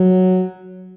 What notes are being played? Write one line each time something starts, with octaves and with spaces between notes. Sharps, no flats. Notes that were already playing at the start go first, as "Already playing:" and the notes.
Already playing: F#3